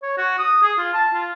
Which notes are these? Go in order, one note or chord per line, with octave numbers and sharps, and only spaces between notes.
C#5
F#4
D#6
G#4
F4
A5
F4